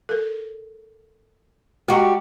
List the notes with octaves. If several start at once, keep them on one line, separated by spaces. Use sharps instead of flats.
A4 A#4
G3 G#3 F#4 D#5 A#5